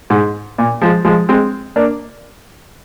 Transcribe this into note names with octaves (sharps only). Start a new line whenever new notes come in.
G#2
A#2
F3 G#3
F3 G#3
G#3 C4
A#3 D4